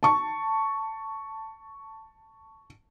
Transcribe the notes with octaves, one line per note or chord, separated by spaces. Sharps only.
A5 C#6